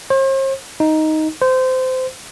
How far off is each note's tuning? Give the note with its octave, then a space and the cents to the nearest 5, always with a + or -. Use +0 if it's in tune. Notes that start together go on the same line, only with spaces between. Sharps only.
C5 +45
D#4 +5
C5 -20